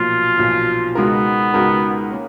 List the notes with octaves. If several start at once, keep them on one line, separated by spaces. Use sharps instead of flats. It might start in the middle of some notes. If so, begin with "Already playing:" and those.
Already playing: B1 A#2 F3 F4
B1 A#2 F3
C#2 B2 G#3 B3 D#4 A#4
C#2 B2 G#3 D#4 A#4
A#3 C#4